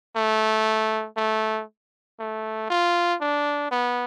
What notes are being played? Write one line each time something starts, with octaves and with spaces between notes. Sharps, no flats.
A3
A3
A3
F4
D4
B3